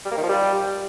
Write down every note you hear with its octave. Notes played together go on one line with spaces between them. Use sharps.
G3
A#3
D#3
F3
G3